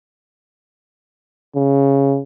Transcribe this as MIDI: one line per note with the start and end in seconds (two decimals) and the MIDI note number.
1.55 2.20 49